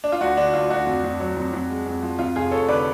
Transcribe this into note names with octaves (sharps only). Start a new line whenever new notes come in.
D4
F4
D2 D4 F#4
D3 D4
D2 F4
D2 D4 F#4
F2
F2
F#3
F2
F2
G#3
F2
F3
F2 F4
F1 F4 G#4
F1 A4 C#5
D3 B4 D5